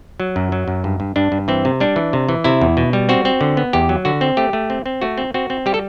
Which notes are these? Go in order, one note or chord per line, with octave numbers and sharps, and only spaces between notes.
F#3
F#2
F#3
F#2
G2
G2
G2 D4
G2
E3 C4
C3
G3 D4
E3
C3
E3
C3 E4
E2
B2
G3
C4 F#4
C4
D3
B3
E2 G4
F#3
D3 F#4
C4
A3 G4
A3
C4
C4
A3 F#4
C4
C4 F#4
C4
G3 G4
A4